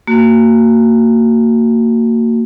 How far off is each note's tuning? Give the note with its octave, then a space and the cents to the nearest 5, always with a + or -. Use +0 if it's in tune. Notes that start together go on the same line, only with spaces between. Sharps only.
A#3 -30 F#4 +0